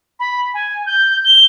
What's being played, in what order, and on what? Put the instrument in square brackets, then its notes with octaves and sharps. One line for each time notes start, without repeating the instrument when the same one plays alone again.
[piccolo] B5
G#5
G6
G7